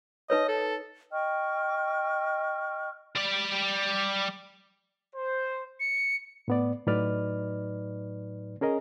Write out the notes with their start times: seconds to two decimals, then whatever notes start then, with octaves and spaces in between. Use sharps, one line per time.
0.30 D#4 B4 C#5 D#5
0.48 A4
1.11 D#5 G5 C#6 F6
3.15 G3 D5
5.16 C5
5.80 C#7
6.48 A2 B3 D5
6.87 A2 F#3 D#4 B4 D5 F6
8.61 C#4 G#4 A#4 D#5